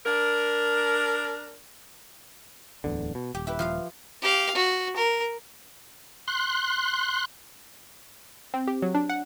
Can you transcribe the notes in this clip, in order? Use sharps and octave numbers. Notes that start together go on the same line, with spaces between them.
D4 A#4
D1 E2 D3
B2
D#1 G4
E4 G4 B4
F3 F4 F5
G4 F5
F#4
A#4
C6 F#6
C4
G4
F#3
D4
F#5